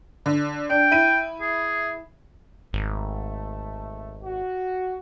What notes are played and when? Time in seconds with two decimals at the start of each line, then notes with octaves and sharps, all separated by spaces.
0.26 D3
0.70 D4 G5
0.91 E4 D#7
1.41 G#4
2.73 G#1 A3
4.23 F#4